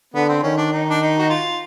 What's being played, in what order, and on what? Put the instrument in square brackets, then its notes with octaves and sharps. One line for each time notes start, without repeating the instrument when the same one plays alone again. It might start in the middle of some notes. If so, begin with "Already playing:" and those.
[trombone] D3 [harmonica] B3
[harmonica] C4
[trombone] D#3 [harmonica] C#4
[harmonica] D4
D#4
D4
D#4
F#4
F4